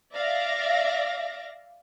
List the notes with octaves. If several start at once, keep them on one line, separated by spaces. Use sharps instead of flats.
D5 E5 F5 A#6